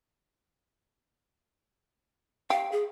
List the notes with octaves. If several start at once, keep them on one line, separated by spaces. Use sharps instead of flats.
G4 F5
G#4